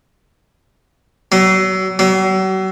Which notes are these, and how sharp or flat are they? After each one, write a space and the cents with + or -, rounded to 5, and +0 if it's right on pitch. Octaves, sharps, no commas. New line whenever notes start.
F#3 +35
F#3 +40